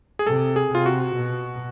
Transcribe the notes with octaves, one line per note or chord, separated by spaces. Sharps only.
G#4
C3 A4
G#4
C3 F4
F#4
B2